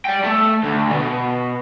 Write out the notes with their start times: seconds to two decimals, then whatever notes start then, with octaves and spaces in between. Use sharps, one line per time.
0.05 D5 G5
0.24 A3
0.63 D2
0.93 B2